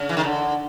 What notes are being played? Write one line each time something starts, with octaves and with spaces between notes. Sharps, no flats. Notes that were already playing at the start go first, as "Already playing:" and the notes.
Already playing: C#3
E3
D#3
D3